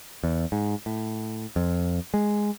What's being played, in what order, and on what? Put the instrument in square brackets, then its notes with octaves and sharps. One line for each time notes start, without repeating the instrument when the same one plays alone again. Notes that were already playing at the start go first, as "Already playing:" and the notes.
[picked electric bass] E2
G#2
A2
F2
G#3